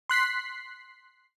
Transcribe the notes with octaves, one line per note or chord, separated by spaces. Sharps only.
C6 F#6 B6 C7